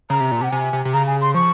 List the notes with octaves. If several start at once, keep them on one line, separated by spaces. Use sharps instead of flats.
C#3 A#5
C3
A#2
C3 F#5
C3 G#5
C3
C3
C#3 A#5
G#5
C6
F3 C#6